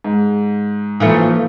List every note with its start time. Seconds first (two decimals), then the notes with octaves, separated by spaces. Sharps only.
0.04 G#2
1.00 E3 F3 A3 A#3 D#4